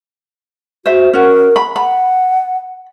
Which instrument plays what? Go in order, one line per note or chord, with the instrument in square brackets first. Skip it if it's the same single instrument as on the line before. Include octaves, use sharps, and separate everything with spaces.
[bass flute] F#4 [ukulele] C5 E5
[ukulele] C#4 F#4 [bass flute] A#4
[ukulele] B5
[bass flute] F#5 [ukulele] B5